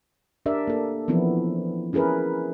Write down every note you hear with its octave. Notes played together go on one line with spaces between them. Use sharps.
D4 G4 A#4 D5 E5
A#3 A4
E3 F3 B3 C4 E4
C#4 E4 G#4 A#4 B4